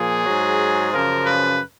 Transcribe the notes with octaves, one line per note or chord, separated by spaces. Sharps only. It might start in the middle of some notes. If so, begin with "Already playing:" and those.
Already playing: A#2 F3 G#4
G#2 F#3
F#2 C#3 F3 A#4
B4